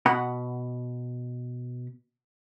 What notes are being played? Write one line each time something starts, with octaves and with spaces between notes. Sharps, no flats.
B2 F#5 B5